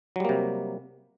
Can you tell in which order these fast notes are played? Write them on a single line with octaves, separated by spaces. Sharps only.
F#3 G3 A#3 C3